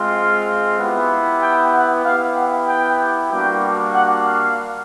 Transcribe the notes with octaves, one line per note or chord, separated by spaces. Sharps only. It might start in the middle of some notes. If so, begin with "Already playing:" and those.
Already playing: G#3 C4 F4
F5
B3 E4 G4
G5
F#5
B3 E4 G4 F5
F#5
G5
G3 A#3 D4 F#4 G5
F#5
F5